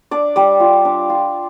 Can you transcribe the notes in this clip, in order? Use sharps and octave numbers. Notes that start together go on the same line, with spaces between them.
D4 D5
G3 D5
F4
D4
F4